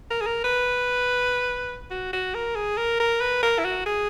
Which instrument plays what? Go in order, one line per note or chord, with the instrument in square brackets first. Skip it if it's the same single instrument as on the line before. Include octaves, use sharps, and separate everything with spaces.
[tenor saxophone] A#4
G#4
A#4
B4
F#4
F#4
A#4
G#4
A#4
A#4
B4
A#4
E4
F#4
G#4